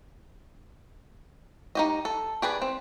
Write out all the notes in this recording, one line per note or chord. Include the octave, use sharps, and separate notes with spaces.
D#4 G4 D#5
A4
G4 G#4 B4 D5
C4